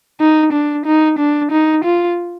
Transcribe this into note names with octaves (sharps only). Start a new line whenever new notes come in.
D#4
D4
D#4
D4
D#4
F4